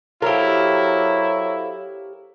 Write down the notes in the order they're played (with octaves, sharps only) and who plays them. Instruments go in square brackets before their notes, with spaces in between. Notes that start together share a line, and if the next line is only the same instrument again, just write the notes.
[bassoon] F#3 [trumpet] E4 [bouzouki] G4 A#4 [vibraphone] A4 C5 F5